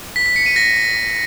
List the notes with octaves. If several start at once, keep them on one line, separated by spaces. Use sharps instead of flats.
B6
B6
C#7
D#7
A#6